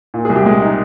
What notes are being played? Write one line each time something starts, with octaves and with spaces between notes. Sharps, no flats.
A#2
G#4
C2
G4
G#3
D#4